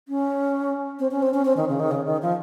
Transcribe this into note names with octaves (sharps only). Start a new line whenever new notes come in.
C#4
C4
C#4
C4
C#4
C4
D#3
C#3
D#3
C#3
D#3
F3